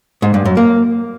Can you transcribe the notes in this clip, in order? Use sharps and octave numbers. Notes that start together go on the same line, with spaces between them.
G#2
G2
F#2
A#3